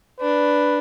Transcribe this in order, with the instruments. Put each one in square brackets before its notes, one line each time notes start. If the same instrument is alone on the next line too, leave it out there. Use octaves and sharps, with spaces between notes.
[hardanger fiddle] D4 [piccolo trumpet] B4